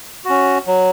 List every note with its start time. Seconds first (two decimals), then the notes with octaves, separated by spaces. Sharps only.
0.25 C#4 F#4
0.67 F#3